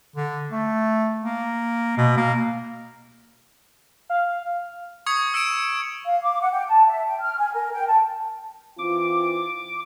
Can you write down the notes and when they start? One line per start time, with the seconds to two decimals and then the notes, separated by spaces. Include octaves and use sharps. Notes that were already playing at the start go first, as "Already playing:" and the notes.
0.16 D3
0.51 A3
1.24 A#3
1.97 B2
2.17 A#3
4.10 F5
5.06 C#6 D#6 G#6 C#7
5.34 E6 C#7 D7 E7
6.06 F5
6.22 D6
6.41 F#5
6.53 G5
6.69 A5
6.86 E5
7.07 G5
7.21 F6
7.38 G#5
7.53 A#4
7.72 G5
7.87 A5
8.78 E3 C4 F4 D6